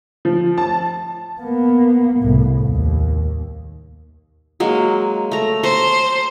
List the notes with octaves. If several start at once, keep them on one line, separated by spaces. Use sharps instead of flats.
F3
A5
A#3 B3
C2 A2
D#2
F#3 G#3 A#3
A3 A#5
C5 A5 A#5 C#6